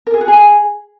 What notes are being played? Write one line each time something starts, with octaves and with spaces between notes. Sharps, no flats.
A#4
G#4
F#4
G#4